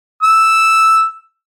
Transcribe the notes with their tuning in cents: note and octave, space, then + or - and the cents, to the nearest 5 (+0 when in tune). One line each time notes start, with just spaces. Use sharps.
E6 +0